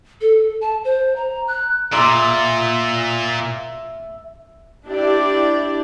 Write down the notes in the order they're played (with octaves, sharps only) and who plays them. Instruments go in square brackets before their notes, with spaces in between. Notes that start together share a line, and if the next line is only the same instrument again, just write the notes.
[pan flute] A4
A5
C5
A#5
F#6
[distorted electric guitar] A#2 [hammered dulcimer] E5 [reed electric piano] A#5 C6 D6
[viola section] D4 E4 G4 D5